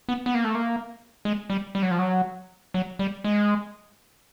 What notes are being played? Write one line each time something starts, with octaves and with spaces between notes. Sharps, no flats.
B3
B3
A#3
A3
A#3
G#3
G3
G3
F#3
F3
F#3
F#3
G3
G#3